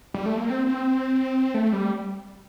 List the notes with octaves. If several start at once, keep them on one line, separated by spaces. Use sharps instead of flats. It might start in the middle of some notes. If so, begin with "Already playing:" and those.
G3
A3
A#3
C4
C4
A3
G3